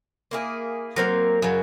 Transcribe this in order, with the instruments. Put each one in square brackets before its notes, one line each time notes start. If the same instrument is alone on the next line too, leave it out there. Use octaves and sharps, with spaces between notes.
[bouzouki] A#3 E4 G#4
[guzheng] F#3 [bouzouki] A#3 C4 A#4
[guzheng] F#2 C#3 F#3